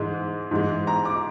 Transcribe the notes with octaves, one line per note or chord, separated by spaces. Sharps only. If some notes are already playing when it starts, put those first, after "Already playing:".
Already playing: G#2 E3 G#3
G#2 E3 G#3
A#5
D6